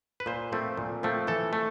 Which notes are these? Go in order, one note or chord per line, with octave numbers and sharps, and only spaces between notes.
B4
A#2 C5
F3 A3 C4
A#2
F3 A3 C4
E3 A4
A3